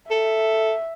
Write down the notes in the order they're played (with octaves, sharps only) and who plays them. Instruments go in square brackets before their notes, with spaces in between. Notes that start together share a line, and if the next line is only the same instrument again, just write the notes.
[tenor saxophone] A4 [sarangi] E5